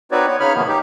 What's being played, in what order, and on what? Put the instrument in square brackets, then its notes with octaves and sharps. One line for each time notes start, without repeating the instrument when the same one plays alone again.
[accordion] C4 D#4 F#4 B4 C#5 D5
B3 C#5
C#3 D#4 C#5 B5 F6
G#2 C3 D#3 F3 A#3 B3
D#4 G4